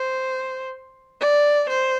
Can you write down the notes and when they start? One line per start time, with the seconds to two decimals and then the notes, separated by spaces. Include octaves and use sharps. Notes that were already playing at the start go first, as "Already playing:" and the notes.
Already playing: C5
1.21 D5
1.69 C5